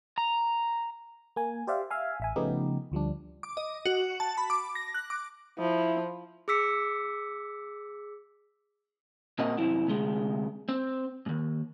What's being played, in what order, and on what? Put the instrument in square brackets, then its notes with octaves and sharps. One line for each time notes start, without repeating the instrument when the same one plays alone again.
[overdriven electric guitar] A#5
[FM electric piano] A#3 G#5
G4 C5 D5 E5 F5
E5 F5 G#5
A1 E5 G#5
C#3 F3 A3 B3 D#4 G4
D2 F3 G3 D4
[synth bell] D6
D#5
F#4
A5
B5
D6
A#6
F#6
D6
[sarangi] F3 [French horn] E4
[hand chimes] G#4 D6 E6 B6 C#7
[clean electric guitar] A#2 C4 A#4 D#5 F#5
C2 F#2 C4 E4
D2 C3 G#3
C4
D#2 G#2